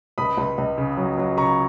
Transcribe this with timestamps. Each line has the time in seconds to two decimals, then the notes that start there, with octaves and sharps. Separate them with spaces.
0.18 C#2 B5 D#6
0.37 C#2
0.58 C#2
0.78 C#3
0.97 F#3
1.18 F#3
1.37 C#3 A#5 C#6